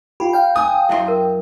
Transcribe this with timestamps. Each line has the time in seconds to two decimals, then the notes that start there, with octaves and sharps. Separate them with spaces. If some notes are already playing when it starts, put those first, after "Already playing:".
0.20 F4 G4 B5
0.33 F5 G5
0.56 G#5 D#6
0.89 F#2 E4 G4 E5 C6
1.08 A#4